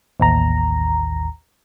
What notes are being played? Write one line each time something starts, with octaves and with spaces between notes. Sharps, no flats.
A1 D#2 A#5